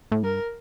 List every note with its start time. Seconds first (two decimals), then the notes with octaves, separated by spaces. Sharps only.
0.12 A2
0.23 G2 A#4